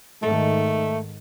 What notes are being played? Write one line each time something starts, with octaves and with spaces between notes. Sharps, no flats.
G#2 D#3 A3 A4